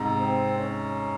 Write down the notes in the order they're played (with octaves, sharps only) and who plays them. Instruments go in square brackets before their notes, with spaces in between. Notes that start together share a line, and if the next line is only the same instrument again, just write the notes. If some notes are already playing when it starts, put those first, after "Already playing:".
Already playing: [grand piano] G#2 C3
[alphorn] C4
C#4